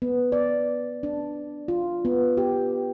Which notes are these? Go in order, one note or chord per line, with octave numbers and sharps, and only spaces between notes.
B3
D5
D4
F4
B3
G4